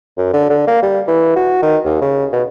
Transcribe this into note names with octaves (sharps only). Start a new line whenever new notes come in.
F#2
D3
D3
A#3
G3
E3
F#4
D#3
D#2
C#3
B2